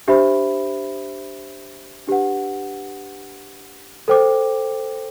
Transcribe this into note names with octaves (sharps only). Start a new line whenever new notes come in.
D4 G4 C5 E5 B5
D4 G4 B4 F#5
A4 C5 G5 D6